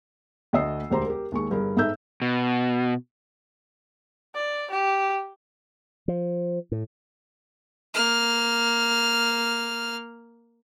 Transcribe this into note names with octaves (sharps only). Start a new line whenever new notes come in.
D2 A3 D#5 E6 C7
E1 D2 G4 C5 A#5 C6
G4 A#4
D#2 G#3 C#6
G1 G2 G#4 A#4
G#2 D#4 A4 E5 E6 G6
B2
D5
G4
F3
A2
A#3 F6